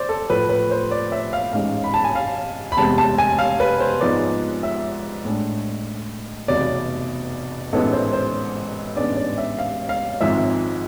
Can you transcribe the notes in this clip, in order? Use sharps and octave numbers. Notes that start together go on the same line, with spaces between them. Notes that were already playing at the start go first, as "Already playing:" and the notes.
Already playing: C5 D5
A4
A2 F3 A3 B4
B4
C5
D5
E5
F5
A1 G#2 G#3 F5
B5
A5
G#5
F5
B5
F1 E2 C3 G#3 C4 A5
A5
G#5
F5
B4
C5
G#2 F3 G#3 B3 D5
E5
A2 G#3 D4
F1 E2 B2 D5
A1 G#2 G#3 B3 E4 A4
C5
C5
A1 G#2 G#3 B3 D4 D5
D5
E5
F5
F5
G#1 G#2 F3 G#3 E5